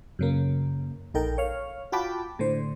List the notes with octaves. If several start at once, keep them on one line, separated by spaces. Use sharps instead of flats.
F#2 C#3 A#3
A#1 D#4 A4 A#4 G5
C#5 F5
F4 F#4 G5 A5 B5 D6
A2 D3 C5